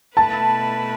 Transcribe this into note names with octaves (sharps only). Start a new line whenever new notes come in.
B2 A3 E4 B4 A5